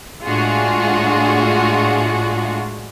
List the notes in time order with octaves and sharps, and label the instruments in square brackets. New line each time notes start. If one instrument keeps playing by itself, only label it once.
[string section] A2 G#3 D4 F4 F#4 G#4